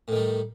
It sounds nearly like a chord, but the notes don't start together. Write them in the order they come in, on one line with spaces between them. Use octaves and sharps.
A2 D#3 G3